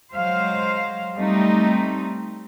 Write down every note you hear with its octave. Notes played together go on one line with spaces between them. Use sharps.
F#3 G#3 C5 F5
G3 A3 C4 D#4